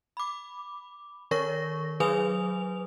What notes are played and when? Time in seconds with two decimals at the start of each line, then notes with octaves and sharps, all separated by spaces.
0.17 B5 D6
1.31 D#3 A#4 C#5 C#6 A#6
2.00 F#3 G#4 B4 G#5 D#6 F7